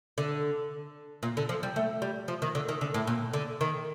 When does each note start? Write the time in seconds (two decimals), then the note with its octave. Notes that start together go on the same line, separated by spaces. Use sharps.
0.18 D3
1.23 A#2
1.37 D3
1.49 F3
1.63 G3
1.76 A3
2.02 G3
2.28 F3
2.42 D#3
2.55 D3
2.69 D#3
2.81 D3
2.94 A2
3.07 A#2
3.33 D3
3.61 D#3